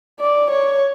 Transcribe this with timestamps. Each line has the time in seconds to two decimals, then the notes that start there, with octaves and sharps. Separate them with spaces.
0.20 D5
0.51 C#5